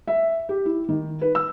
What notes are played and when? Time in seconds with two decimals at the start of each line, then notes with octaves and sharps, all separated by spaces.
0.07 E5
0.49 G4
0.66 E4
0.89 D#3
1.21 B4
1.35 E6